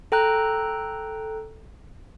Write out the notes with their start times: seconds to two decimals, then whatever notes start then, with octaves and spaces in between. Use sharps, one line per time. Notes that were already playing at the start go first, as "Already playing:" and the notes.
0.12 A4 G5 A#5 F#6